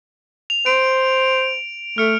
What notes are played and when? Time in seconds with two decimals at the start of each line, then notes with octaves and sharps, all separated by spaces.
0.50 F7
0.66 C5 D7
1.98 A3 F6 C#7